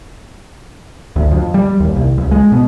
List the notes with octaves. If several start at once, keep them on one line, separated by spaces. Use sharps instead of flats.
D2
F2
G3
D#2
C2
C#2
G#3
B2